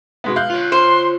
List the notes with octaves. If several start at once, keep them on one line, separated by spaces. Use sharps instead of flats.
B2 G#3 B3
F5 F#6 G6
F4 C#5
C5 C6